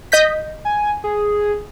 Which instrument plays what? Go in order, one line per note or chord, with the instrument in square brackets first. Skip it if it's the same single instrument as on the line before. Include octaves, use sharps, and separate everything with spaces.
[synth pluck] D#5 G6 B6
[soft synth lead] G#5
G#4